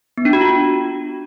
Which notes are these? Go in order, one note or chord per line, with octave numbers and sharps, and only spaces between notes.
B3
D4
F#4
F4